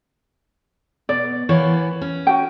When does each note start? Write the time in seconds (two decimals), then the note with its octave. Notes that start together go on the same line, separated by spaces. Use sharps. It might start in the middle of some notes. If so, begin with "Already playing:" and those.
1.09 B2 D5
1.49 E3 A#3 B3 C#5
2.01 C#4
2.27 F#4 G5